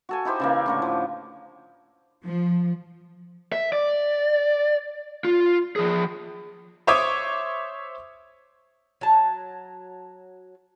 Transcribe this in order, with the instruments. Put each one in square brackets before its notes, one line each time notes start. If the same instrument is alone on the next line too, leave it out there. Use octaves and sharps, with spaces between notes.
[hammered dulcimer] F#4 A4 G#5
D#4 E4 G4 C5
C#3 E3 A#3
A2 D3 C#6
F3
[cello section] F3
[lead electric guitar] E5
D5
F4
F3 G#4
[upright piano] C5 C#5 E5 D6 D#6 G#6
[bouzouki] F#3 A5